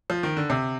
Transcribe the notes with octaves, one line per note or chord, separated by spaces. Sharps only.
F3
D#3
D3
C3